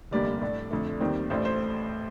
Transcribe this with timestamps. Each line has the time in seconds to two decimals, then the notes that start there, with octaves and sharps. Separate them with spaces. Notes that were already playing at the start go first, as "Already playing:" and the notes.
0.11 F1 D#2 D3 G3 A#3 D5
0.41 A2 A3 D4
0.71 F2 D3 A3
1.00 D#2 D#3 G3 C4
1.30 A1 A2 A3 D4 C5
1.45 C5